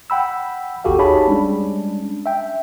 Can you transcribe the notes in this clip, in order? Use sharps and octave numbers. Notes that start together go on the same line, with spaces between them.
F#5 G5 B5 E6
G#1 D#2 F#4 G4 A4 F5
D#4 G4 G#4 C#5 A5 B5
G3 G#3 C#4 D4
E5 G5